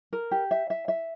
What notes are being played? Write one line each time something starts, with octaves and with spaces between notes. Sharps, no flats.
A#4
G4
E5
E5
E5